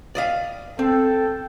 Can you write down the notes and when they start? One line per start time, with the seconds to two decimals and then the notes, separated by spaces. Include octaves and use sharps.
0.15 D5 D#5 F5
0.79 C4 A4 G5